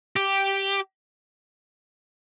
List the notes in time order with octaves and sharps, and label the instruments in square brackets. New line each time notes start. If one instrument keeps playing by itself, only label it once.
[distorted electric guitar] G4